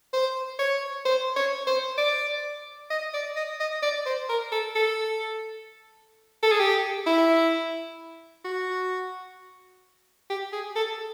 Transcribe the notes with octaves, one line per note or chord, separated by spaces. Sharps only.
C5
C#5
C5
C#5
C5
D5
D#5
D5
D#5
D#5
D5
C5
A#4
A4
A4
A4
G#4
G4
E4
F#4
G4
G#4
A4